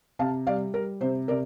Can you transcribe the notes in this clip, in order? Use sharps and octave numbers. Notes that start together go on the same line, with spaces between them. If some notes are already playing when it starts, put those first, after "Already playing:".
C3 F5 A5
G3 D5 F5
G3 A#4
C3 C5
C3 A#4 D5